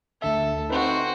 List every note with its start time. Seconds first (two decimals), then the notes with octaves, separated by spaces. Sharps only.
0.22 D2 D3 A4 E5
0.70 C4 D#4 F#4 B4